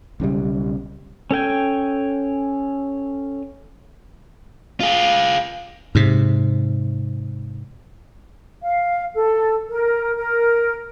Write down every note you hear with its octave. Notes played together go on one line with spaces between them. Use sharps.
B1 C#3 E3 G3
C#4 A4 G5 G#5
F4 G#4
G#2 C3
F5
A4
A#4
A#4